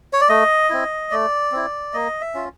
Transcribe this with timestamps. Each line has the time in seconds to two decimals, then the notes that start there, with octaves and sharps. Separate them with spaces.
0.13 C#5
0.21 D5
0.29 A3 D#5
0.70 C4 E4
1.11 A3 D5
1.52 C4 E4
1.93 A#3 D#5
2.21 E5
2.34 C#4 F4